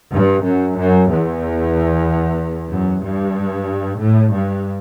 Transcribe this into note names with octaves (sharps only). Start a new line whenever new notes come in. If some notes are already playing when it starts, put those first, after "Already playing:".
G2
F#2
F#2
E2
F#2
G2
A2
G2